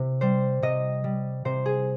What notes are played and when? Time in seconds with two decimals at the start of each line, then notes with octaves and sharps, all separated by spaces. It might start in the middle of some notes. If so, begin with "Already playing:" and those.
Already playing: C3
0.21 G3 C5
0.62 C3 D#5
1.04 G3
1.45 C3 C5
1.66 G#4